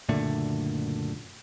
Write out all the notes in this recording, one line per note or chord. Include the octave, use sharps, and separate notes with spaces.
F#1 A#2 D3 A3